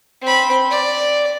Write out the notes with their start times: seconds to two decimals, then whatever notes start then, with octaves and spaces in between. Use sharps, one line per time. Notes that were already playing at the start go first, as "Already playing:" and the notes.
0.22 C4 B5
0.71 D5